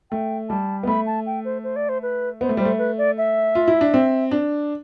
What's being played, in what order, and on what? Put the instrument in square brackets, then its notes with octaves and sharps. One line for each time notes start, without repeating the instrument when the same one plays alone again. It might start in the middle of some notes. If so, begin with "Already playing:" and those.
[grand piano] A3 [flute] G5
[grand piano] G3 [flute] A5
[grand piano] B3
[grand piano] A3 [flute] B5
[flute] A5
G5
C5
C5
D5
C5
B4
[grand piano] B3 [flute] C5
[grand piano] A3
[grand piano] G3 [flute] C5
[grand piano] A3
[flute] B4
D5
E5
[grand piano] F4
E4
D4
C4
D4